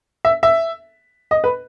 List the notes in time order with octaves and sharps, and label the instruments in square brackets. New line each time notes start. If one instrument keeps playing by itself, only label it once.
[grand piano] E5
E5
D#5
B4